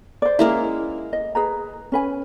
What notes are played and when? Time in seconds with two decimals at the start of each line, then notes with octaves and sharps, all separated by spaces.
0.22 C5 D5
0.39 G#3 A#3 C#4 E4 A#4 E5
1.13 D#5
1.35 G#4 B4 A#5
1.92 C#4 B4 G#5